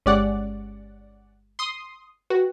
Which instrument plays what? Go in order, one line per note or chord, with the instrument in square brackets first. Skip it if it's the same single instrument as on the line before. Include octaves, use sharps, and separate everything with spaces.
[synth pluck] G1 G#3 G4 [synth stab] C#4 D5 F#5
[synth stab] C6 D#6
[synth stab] F#4 [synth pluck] B4 G5